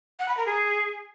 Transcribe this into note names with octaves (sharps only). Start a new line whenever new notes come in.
F#5
B5
A#4
G#4